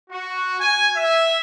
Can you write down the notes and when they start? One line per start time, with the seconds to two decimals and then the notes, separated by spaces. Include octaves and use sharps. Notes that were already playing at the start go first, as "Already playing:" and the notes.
0.10 F#4
0.59 G#5
0.96 E5